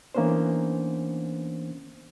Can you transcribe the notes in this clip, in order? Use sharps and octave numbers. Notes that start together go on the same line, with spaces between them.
E3 A#3 B3 C#4 D4 C5